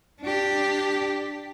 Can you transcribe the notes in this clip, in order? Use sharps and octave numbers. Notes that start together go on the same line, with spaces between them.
D4 G4